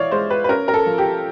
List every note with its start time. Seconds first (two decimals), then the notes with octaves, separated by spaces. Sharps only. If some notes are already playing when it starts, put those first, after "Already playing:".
Already playing: E3 C#5 D5 E5 F5
0.12 G#3 C5
0.30 B4
0.44 B4
0.49 C#4 A#4
0.68 A#4
0.74 A4
0.86 F3
0.98 G4